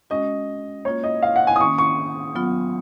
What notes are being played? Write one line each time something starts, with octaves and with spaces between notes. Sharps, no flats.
G#3 C#4 F#4 D#5
A#3 C#4 F4 C#5
D#5
F5
F#5
G#5
D#6
D#3 A#3 C#4 C#6
C#6
F#3 B3 F4